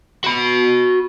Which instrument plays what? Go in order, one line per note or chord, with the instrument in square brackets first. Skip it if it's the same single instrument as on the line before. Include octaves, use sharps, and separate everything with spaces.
[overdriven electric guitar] F#4 B5